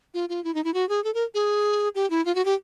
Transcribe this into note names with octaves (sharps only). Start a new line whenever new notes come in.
F4
F4
E4
D#4
E4
F#4
G#4
A4
A#4
G#4
G4
E4
F4
F#4
G4